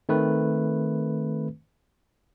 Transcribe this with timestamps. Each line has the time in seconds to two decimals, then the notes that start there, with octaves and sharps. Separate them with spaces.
0.09 D#3 A3 C4 B4